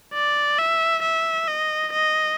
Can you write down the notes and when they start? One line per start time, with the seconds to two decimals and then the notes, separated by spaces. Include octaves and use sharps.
0.14 D5
0.59 E5
1.03 E5
1.48 D#5
1.93 D#5